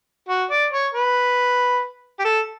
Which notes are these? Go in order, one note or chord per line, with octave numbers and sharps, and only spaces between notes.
F#4
D5
C#5
B4
G4
A4